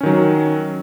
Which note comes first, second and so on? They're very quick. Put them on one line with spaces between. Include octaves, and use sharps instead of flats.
C#4 D#3 F#3